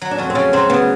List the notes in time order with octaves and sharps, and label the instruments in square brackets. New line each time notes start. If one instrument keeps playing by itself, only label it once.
[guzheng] F#3
[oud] D4
[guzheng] F2 [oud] C#4
[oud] C4
[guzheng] C#3 [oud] C#4
[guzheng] F#3 [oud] C4
[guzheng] C#3 [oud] B3